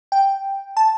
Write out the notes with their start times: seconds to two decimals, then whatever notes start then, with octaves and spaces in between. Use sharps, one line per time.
0.12 G5
0.77 A5